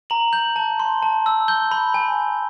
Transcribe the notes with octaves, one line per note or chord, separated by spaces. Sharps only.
A#5 F#7
G6 F#7
A5
C6
A5
E6
G6 G7
B5
G#5